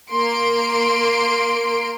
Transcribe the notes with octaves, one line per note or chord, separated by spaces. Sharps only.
A#3 C6 D7